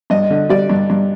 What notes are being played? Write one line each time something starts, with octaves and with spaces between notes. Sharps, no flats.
G2 D#5
D3
G3 D5
G2
G2